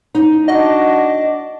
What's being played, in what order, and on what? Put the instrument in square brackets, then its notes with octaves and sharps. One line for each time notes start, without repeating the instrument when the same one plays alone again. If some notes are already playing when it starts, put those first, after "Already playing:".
[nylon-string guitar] D#4
[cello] D4 [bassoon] F#4 [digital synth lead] D#5